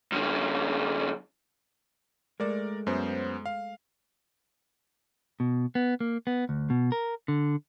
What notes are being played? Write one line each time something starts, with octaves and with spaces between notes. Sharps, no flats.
F#2 D3
G#3 A3 A#4 D5
F#2 B3 C5
F5
B2
B3
A#3
B3
D2
B2
A#4
D3